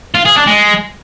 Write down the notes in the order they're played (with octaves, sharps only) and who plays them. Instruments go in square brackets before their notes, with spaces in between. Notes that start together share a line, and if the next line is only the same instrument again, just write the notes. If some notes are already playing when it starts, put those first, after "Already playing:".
[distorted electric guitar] F4
G#4
D4
G#3